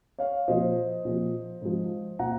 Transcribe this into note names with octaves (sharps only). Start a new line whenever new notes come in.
C#5 F5
A#2 F3 C5 D#5
A#2 F3
G#2 F3
A#2 F#5 A#5